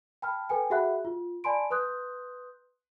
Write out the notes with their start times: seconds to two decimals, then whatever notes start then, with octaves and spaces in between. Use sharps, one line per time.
0.22 G5 A5 B5 F6
0.49 A4 B4 G5 G#5
0.70 F#4 G#4 E5 F#5 B5 F#6
1.05 F4
1.44 D5 G#5 A5 B5 C6 D7
1.70 B4 C6 D#6 F#6 G6